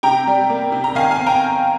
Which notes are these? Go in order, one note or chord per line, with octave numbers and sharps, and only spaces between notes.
C3 G5 A#5
G3
A#3
C3
A#5
D#3 F5 G#5
F5 G#5
C4
G5 A#5